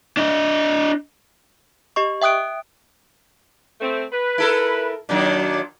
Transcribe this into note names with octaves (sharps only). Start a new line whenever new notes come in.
D4 D#5
G4 D#5 C#6
E5 G5 D#6 F#6 D7
A3 C4
B4
E4 A4 A#4
A#2 D#3 F#3 D4